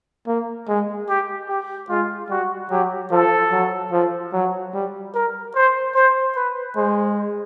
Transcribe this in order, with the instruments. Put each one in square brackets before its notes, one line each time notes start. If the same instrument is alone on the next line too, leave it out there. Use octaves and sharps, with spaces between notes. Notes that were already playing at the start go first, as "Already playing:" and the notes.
[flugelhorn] A#3
G#3
[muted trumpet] G4
G4
[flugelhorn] G#3 [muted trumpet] F4
[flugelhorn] G3 [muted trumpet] F#4
[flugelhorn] F#3 [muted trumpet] G4
[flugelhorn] F3 [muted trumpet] A4
[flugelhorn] F#3
F3
F#3
G3
[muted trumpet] A#4
C5
C5
B4
[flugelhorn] G#3 [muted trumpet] C5